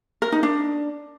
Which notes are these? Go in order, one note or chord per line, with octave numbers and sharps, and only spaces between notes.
A#4
D#4
D4